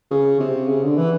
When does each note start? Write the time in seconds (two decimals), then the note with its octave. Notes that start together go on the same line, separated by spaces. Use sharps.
0.11 C#3
0.40 C3
0.68 C#3
0.83 D3
0.98 E3